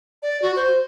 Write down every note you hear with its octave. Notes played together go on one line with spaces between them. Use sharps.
D5
F#4
C5